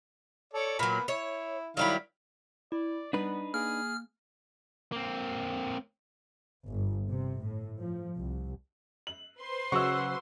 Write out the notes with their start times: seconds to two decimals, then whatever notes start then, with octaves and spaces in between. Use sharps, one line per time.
0.54 A4 C#5 D5
0.79 A#2 F#3 A#3 B3 B5
1.08 E4 C#5
1.77 D#3 F#3 G3 E4 F5
2.72 E4 D5
3.13 G3 B3 D4 D#4 B4
3.54 A#3 G#4 F6
4.92 A#3 C4
6.67 G1
7.07 C3
7.41 A2
7.78 F3
8.16 C2
9.07 F#7
9.41 B4 C5 C6
9.72 C#3 F#3 F#5 C#6 E6